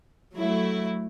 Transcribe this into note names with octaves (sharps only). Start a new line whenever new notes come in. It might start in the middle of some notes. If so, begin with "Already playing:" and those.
F#3 A3 E4